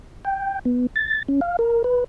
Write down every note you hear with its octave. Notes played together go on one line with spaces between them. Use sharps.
G5
B3
A6
C#4
F5
A#4
B4